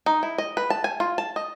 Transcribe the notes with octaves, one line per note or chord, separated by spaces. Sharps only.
D#4
E4
D#5
B4
A5
G#5
F4
A5
D#5